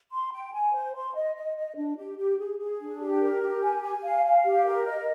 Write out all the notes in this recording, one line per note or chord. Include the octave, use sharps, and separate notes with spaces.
C6
G5
G#5
C5
C6
D#5
D#5
D#5
D4
G4
G4
G#4
G#4
D4
G4
A#4
G4
G#5
G#5
F5
F5
G4
A#4
D#5